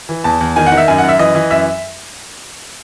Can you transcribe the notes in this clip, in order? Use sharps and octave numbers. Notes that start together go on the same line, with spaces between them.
E3
E2 A5
E2
D#3 G#5
F#5
D#3
E5
F#2 G#5
F#2 F#5
E5
E3 D#5
E3
F#2 E5